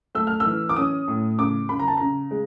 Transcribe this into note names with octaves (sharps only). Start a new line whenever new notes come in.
A3 E6
F6
E6
E3
D6
C#4 D#6
A2
C#3 D6
C#3 B5
A#5
A5
C#3 A#5
G#3